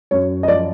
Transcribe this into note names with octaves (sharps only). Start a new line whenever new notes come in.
F#2 C#5
D#5
F3 D5